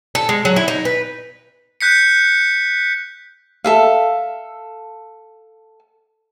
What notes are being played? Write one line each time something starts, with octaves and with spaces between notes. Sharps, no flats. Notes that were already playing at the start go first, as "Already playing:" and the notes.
A4
G#3
F#3
E4
D#4
B4
F#6 G6 B6 C#7
A4 E5 F5